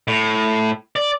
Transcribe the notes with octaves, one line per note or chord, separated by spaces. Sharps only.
A2
D5